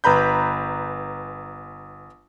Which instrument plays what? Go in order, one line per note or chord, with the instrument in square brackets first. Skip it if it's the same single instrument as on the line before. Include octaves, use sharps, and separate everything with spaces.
[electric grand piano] G1 B4 A#5 B5 G6